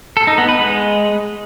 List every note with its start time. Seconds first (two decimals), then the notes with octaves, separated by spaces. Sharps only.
0.17 A4
0.27 D#4
0.38 B3
0.49 B4
0.59 G#3